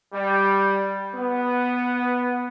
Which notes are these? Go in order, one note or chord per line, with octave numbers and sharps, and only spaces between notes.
G3
B3